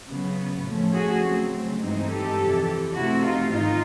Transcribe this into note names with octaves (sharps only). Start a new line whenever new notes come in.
C#3 F#3 B3
A2 F3 A3 C#4
F#4 G#4
C#3 F#3 A3 C4
G2 E3 G#3 C4 D#4
G4 A4
F2 C3 E3
C3 E3 A3 C4 E4 F#4
D#4 F4
G#2 D#3 D#4 F4